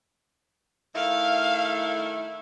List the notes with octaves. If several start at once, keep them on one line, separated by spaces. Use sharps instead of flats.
D#3 A3 E4 F5